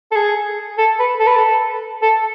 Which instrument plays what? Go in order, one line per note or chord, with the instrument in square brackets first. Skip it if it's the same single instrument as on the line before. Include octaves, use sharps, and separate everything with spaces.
[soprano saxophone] A4
G#4
A4
B4
A4
B4
A4
A4